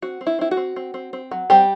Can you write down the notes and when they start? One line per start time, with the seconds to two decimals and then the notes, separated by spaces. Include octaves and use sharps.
0.02 C4 F#4
0.21 C4
0.27 E4
0.39 C4 E4
0.51 F#4
0.57 C4
0.76 C4
0.94 C4
1.13 C4
1.31 F#3
1.50 G3 C4 G4